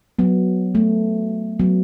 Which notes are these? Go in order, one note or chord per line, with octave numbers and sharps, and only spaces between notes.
F#3 B3
A3
F#3 B3